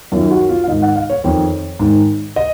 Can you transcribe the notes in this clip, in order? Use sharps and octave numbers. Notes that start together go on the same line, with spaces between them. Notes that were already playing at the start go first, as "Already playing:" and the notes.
F#2 D#3 F4
F#4
F4
F5
G#2 D#3 D#5
F#5
F5
C#5
F2 D#3 C#5
G#2 D#3
D#5